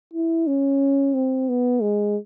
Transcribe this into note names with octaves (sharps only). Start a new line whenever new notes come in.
E4
C#4
C4
B3
G#3